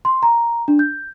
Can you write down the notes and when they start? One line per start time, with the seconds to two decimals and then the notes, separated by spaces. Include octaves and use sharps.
0.05 C6
0.23 A#5
0.68 D4
0.79 G6